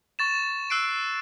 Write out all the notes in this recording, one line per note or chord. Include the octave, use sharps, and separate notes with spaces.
C#6 A6 E7
E6 F#6 C7 D7